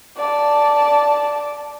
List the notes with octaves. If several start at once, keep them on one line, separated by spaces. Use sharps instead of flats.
D5 A5